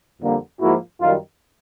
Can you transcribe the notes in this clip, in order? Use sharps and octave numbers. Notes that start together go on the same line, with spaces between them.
F2 D3 G3 A#3
G#2 F3 A#3 E4 F#4
F#2 D#3 G3 D#4 F4